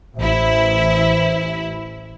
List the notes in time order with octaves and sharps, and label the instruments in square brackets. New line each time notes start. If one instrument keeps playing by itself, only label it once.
[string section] A1 E4 [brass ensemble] C5 E5